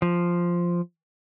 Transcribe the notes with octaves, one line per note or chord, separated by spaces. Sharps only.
F3